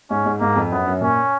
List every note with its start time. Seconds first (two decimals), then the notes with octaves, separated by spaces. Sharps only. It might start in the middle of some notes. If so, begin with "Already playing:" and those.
0.10 G#2 C#4
0.26 G#2
0.40 G#2 A#3
0.56 F2
0.71 F#2 B3
0.86 F#2
1.01 A#2 C#4